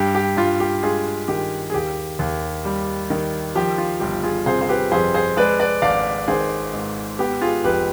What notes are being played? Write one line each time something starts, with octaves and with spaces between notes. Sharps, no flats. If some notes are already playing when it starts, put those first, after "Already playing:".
Already playing: G2 G4
G4
G2 F4
G4
G#3 F4 G#4
D#3 G4
G#4
D#2 G4
D#2
G3
D#3
F3 G4
F4
G1 G4
F4 G#4
C3 G#4 C5
C5
G4 B4
F2 G#4 C5
G#4 C5
G#3 B4 D5
B4 D5
G#1 D5 F5
D#3 G#4 C5
G#2
B3 G4
F4 G#4
F1 G4 B4